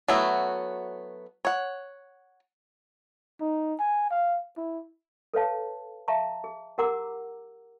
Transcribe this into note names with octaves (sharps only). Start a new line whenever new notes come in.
F#3 A3 B3 E4 F#4
C#5 F#5
D#4
G#5
F5
E4
A4 B4 C#5 F5 A5
E5 F5 A5 A#5 C#6
G#4
G4 A#4 F#5 A#5 D6 E6